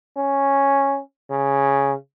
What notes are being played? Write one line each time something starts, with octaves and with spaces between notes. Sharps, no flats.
C#4
C#3